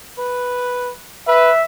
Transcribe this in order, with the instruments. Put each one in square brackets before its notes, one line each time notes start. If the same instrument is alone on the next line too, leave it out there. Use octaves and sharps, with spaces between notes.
[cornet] B4
[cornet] B4 [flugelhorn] E5